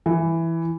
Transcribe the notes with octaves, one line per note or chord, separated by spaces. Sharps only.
E3